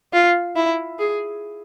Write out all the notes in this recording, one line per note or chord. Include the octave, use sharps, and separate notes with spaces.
F4
E4
G#4